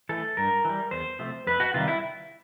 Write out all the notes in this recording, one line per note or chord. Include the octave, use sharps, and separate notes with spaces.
E3 A3 A4
G2 A#4
E3 G3
E2 C5
C3 F3 A3
F2 B4
F#4
C3 D#3 G3 F4
E4